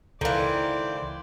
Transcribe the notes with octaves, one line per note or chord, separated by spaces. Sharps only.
C#2 D#3 E3 A4 A#4 C5 D5 F5